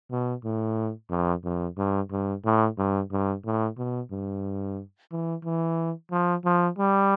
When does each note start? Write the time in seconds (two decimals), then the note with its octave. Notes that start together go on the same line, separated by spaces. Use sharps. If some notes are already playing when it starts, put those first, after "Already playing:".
0.11 B2
0.44 A2
1.10 F2
1.44 F2
1.78 G2
2.11 G2
2.45 A2
2.78 G2
3.12 G2
3.45 A2
3.78 B2
4.11 G2
5.12 E3
5.45 E3
6.12 F3
6.45 F3
6.78 G3